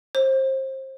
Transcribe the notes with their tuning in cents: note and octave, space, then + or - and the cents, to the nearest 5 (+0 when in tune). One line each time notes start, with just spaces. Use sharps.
C5 +25